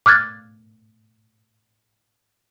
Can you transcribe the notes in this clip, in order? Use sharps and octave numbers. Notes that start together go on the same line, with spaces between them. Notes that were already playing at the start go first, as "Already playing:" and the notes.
D6 F6 F#6 G#6 A6